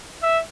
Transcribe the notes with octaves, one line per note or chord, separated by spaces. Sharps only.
E5